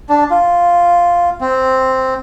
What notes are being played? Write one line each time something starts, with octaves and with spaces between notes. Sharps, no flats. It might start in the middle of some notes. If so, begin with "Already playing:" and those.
D4
F4
C4